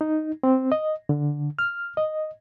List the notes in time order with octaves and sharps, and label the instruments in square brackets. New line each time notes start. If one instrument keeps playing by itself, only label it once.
[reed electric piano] D#4
C4
D#5
D3
F6
D#5